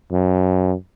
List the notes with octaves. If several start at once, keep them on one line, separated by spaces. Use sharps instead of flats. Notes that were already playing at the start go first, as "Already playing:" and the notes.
F#2